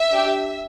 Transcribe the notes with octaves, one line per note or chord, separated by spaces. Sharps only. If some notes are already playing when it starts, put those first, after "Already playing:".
Already playing: E5
D4 G4